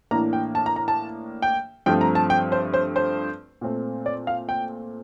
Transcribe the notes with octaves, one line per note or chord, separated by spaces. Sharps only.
A2 E3 A#3 D4 A#5
G5
A5
A#5
A#5
A5
G5
G2 F3 A3 C4 G5
A#5
A5
G5
C5
C5
C5
A#2 A3 C4
D5
F5
G5